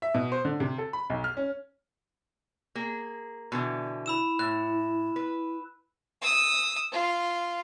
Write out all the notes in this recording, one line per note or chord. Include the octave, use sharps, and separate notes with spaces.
E5
B2
C5
D3
C3
A4
B5
B1
F6
C#4
A#3 G#4
B2 D3 E3
E4 B5 E6 E7
A2 F#6
B4
D#6 E6
F4